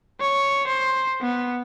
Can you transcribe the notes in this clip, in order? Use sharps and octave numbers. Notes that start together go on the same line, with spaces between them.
C#5
C5
B3